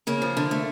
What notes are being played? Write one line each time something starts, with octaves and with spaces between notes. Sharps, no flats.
C#3 A#3
F3
D3
A3